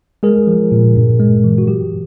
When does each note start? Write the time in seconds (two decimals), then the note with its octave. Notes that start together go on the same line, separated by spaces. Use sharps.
0.23 G#3 G#4 A#4
0.47 F3
0.72 A#2
0.96 G2
1.20 G#3
1.44 E3
1.58 F#4
1.67 F#3 G4